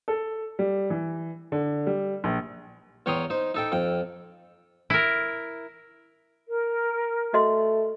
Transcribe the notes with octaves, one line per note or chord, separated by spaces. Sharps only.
A4
G3
E3
D3
G3
A#1
E2 C#5 G5 A#5 C6 D#6
D#4 C5
D#4 A4 G5
F2 G5
E4 A#4
A#4
A3 F#4 D#5 C6